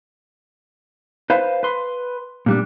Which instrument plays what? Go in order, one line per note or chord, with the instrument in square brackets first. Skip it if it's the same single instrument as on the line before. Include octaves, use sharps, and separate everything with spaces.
[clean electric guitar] B4 C5 F5
B4 C6
A#2 G3 D4